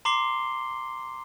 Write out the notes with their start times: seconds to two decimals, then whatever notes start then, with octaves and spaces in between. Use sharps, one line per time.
0.05 A#5 C6 D6 C7 G7